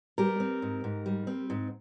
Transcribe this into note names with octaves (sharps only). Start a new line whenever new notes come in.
G3 G4 A#4
C4
G#2
G#2
G3
C4
G#2